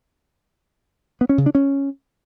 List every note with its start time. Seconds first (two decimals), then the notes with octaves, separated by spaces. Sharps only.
1.21 B3
1.29 C#4
1.38 C#3
1.46 D4
1.55 C#4